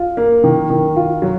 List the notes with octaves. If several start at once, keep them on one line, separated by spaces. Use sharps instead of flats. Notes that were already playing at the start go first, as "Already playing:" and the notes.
Already playing: F4
A#3
D#3
D#3
F4
F#3